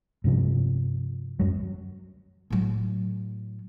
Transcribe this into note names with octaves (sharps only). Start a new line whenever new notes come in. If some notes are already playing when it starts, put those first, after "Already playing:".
G2 C3 F3
F#2 F#3
A2 F#3